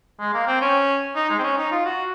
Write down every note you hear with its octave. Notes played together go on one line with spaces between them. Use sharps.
G#3
A#3
C4
C#4
D#4
G#3
C4
C#4
D#4
F4
F#4